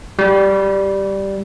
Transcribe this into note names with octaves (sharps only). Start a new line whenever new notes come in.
G3